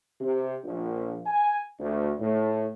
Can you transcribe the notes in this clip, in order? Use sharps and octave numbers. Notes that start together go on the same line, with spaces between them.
C3
A#1
G#5
D2
A2